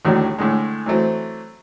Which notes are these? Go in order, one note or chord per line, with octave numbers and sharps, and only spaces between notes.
D#2 A2 D3 F#3 G3
A2 D3 G#3
E3 F#3 A3 C4